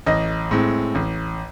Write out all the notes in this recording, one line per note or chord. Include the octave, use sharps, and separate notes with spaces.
A1 D#5
A2 G#3 C4
A1